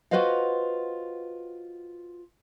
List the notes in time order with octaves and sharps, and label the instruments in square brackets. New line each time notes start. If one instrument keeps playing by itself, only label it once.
[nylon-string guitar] F4 F#4 B4 C5 D#5 F5